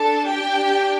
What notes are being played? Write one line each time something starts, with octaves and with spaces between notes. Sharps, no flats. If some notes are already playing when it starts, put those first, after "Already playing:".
Already playing: D4 A4 A5
G4 G5